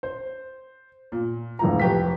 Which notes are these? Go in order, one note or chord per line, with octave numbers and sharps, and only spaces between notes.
C5
A#2
E1 A2 A#5
F1 G4 B4 B6